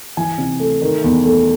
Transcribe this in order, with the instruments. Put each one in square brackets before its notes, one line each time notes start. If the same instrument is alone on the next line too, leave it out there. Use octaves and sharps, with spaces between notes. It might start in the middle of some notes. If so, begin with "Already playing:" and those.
[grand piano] E3 G#5
C3
A3
D#3
E2
A3